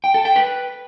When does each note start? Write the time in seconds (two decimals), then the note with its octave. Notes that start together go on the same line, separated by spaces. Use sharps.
0.04 G5
0.14 A4
0.25 G5
0.36 B4